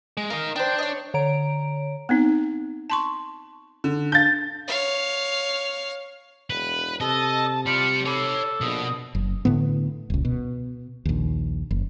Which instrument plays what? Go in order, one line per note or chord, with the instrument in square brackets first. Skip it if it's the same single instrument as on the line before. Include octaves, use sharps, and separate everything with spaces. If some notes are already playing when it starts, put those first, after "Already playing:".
[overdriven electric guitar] G#3
[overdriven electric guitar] A#4 D#5 [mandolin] F5
[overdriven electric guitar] D4 [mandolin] C5 G5
[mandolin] C#5 D#5
[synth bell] D3 C#5 A#5 D7
[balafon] B3 C4 D#4
A5 C6 C#6
[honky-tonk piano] D3
[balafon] D4 F5 [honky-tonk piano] G6 A6
[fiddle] C#5 F5
[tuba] E1 [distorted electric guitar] B4
[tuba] C3 [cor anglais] A4 [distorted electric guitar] D#5 [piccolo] A5
[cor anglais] F4 [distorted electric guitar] G4 D5 [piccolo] C#7
[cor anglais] A4 [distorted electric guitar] C#5 B5 [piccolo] D6
[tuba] A#1 [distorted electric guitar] B2 [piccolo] D#6
[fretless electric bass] F#1
A2 D3 B3
D#1 C#2
B2
A#1 D#2
F#1